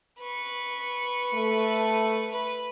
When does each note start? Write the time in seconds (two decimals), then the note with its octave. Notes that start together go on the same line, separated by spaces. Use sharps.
0.20 B4 C#6
1.34 A3
2.31 B4